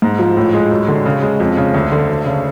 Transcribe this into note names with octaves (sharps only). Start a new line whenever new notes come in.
G#2
F3
A2
G#3
F#2
D3
C#3
G#3
F2
C#3
D2
D3
D2
C#3